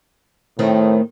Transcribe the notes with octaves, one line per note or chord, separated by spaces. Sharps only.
A2 D#3 A3 C4